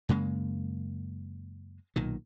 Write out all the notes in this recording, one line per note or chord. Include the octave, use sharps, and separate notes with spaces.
F#2 C#3 G#3 A#3
B1 A#2 D#3